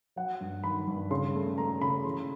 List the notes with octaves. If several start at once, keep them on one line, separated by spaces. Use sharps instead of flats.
F#3 F#5
G2
D#3 B5
G2
C#3 C6
A3
A3 A#5
C#3 B5
E3 C6